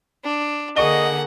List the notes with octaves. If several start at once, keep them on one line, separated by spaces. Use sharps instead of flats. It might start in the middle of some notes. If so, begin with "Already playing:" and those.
D4
D3 A#3 G#4 D#5 F#5 C#6 G7